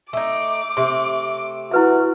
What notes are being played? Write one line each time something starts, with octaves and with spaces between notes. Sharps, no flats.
A3 D#4 D6
C3 A3 C6
E4 F#4 B4 E5